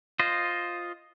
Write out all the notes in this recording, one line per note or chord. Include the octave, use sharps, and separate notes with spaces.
F4 C5 D#5